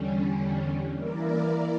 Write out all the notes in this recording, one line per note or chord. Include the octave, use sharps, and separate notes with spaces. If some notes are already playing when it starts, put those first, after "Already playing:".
Already playing: E2 D3 G3 C#4
E3 A#3 E4 A#4 D5